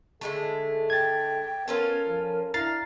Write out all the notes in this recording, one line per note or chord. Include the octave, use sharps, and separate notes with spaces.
D3 G#3 A3 A4
G5 G#6 A6
B3 C#4 F4 A4 A#4
F3
D4 E4 F5 A#5 A6 C7